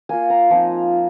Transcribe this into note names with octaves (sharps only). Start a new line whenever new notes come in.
A#3 F4 G#5
A#5
F3 C4 D#4